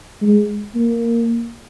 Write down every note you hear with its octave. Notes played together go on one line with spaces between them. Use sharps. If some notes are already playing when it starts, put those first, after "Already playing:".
G#3
A#3